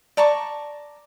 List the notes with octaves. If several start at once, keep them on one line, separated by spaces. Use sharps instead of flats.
D5 A5 A#5 C#6